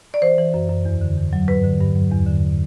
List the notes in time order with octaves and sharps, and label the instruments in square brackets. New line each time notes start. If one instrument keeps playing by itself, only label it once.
[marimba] D5
E3 C5
E3
F#2
F#2
E2
D3
E2
F#3
G2 B4
D3
G2
F#3
E2
D3